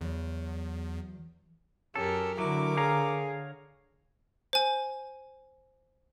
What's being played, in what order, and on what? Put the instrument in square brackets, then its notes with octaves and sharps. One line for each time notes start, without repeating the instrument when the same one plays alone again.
[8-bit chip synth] E2 [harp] E3 F#3
[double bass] F#2 [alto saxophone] C#4 [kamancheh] G4 A#4 [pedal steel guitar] A4
[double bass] D3 [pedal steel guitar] F#3 [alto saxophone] E4 [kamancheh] A#4 D6
[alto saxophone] G#4 [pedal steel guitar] C#5 F5 A#5
[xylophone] C5 G#5